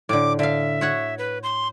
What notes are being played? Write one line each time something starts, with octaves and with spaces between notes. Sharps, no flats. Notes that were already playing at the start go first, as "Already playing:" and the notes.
A2 D3 D6
D3 E5 F5
F#4 C#5 F#5
B4
C6